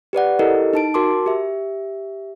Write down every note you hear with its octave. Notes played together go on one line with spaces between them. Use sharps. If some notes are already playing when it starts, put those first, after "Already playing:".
G4 B4 D5 F#5
E4 G4 A4 A#4 D#5
D#4 A5 D7
F#4 A#4 A5 C6 D6
G4 E5